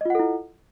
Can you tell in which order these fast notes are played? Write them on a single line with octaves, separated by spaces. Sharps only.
D#5 F4 F#5 A4 E4